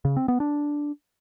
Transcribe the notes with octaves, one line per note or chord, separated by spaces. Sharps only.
C#3
C4
B3
D4